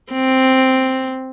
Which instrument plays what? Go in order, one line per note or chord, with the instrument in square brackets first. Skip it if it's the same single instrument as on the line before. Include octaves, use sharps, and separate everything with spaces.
[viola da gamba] C4